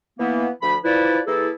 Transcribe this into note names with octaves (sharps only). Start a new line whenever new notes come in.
E3 A#3 B3
D2 F3 B5
F3 E4 B4 D5
E3 A#3 E4 G#4 A4